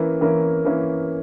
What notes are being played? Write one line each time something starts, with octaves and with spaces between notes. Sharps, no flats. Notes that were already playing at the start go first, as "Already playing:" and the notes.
Already playing: E3 A#3 C#4 E4 A#4
E3 A#3 C#4 E4 A#4
E3 A#3 C#4 E4 A#4